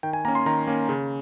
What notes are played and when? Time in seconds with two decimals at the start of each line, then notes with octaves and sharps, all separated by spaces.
0.03 D#3 G5
0.13 G#5
0.25 A#3 A#5
0.28 C#4
0.35 C6
0.46 D#3 A#5
0.67 A#3 C#4
0.89 C#3